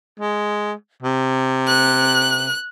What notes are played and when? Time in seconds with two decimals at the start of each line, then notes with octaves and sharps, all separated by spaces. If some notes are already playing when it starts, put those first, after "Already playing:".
0.20 G#3
1.03 C3
1.66 F#6